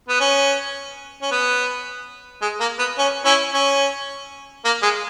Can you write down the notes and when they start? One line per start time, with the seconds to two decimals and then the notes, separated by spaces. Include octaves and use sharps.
0.09 B3
0.20 C#4
1.22 C#4
1.31 B3
2.42 G#3
2.60 A#3
2.79 B3
2.98 C#4
3.25 C#4 E4
3.53 C#4
4.65 A#3
4.82 G#3